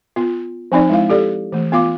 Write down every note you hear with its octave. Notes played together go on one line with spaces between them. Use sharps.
B3 F4
F3 C4 D#4 D5
G#3 E4 F5
G4 A4 D5
E3 A3
B3 F4 F5 D6